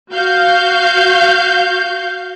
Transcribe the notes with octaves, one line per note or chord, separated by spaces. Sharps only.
F#4 F5 G6